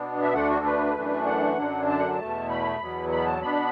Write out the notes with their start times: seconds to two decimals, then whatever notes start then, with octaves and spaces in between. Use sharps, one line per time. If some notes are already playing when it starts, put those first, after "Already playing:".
Already playing: B2 B3 D4
0.22 E5
0.34 D2 D3 A3 D4 F#5
0.50 F#4
0.59 A4
0.66 B4
0.96 F#2 E3 A3 D4
1.26 F#5
1.57 F#2 D3 F#3 D4
1.89 A5
1.99 F#5
2.11 A5
2.19 E2 B2 A3
2.50 B5
2.80 E2 B2 F#3 B3
3.12 B5
3.26 A5
3.42 B2 B3 D4 B5